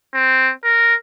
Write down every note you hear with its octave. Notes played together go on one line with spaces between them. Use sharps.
C4
A#4